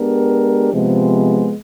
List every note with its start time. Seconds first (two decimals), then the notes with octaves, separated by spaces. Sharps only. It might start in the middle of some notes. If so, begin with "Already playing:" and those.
Already playing: G#3 B3 D4 G4 A#4
0.72 C3 F3 G#3 B3